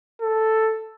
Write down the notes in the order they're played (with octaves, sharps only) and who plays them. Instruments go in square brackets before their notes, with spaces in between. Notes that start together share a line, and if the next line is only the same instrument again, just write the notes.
[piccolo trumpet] A4